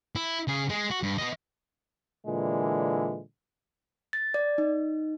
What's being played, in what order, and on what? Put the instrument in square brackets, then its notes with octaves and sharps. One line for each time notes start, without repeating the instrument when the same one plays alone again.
[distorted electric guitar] E4
C#3 G#4
G#3 G#4
F#4
G2
B3 D#5
[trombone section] A#2 D3 E3 G#3
[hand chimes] A6
D5
D#4